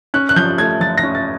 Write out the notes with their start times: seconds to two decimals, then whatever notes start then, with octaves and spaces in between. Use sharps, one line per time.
0.14 C#4 F#6
0.29 F#6
0.36 F3 G6
0.58 A3 G#6
0.80 F3 A6
0.98 A#6
1.03 C#4
1.15 A6